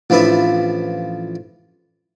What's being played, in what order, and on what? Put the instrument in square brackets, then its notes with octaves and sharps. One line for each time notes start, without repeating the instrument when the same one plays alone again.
[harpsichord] A1 F3 D4 B4 E5